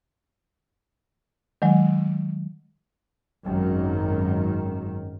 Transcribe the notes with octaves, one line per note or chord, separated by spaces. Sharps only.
D#3 F#3 G#3
G#1 F#2 D#3